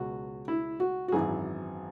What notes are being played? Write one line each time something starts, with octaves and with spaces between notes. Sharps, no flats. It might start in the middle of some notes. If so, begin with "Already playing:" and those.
Already playing: C#2 B2 F#3 F#4
E4
F#4
F#4
G#1 F#2 E3 G#4